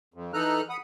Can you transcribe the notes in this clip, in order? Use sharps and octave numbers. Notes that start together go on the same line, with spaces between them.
F2
E3 D#4 A4 A#5 F6 F#6
F#5 B5 D#6